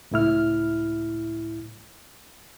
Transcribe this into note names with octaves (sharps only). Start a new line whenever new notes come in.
C#2 A2 E4 F6